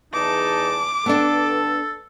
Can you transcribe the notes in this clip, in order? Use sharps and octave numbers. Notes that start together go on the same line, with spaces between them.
E2 D#4 A5 D6
G2 D3 B3 D4 A4 A5